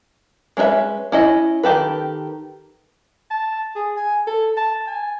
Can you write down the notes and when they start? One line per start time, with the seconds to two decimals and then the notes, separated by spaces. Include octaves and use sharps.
0.57 G#3 C#4 D4 B4 E5
1.12 C#4 E4 D#5
1.63 D#3 G4 A4 B4
3.31 A5
3.76 G#4
3.97 G#5
4.27 A4
4.57 A5
4.87 G#5